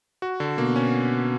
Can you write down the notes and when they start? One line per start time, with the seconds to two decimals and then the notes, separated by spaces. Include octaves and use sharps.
0.22 F#4
0.40 D3
0.58 B2 A#3
0.76 C#4